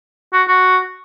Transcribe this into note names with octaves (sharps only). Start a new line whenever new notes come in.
F#4
F#4